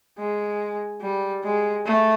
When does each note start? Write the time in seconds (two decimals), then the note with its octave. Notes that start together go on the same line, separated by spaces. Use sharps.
0.19 G#3
1.01 G3
1.43 G#3
1.86 A3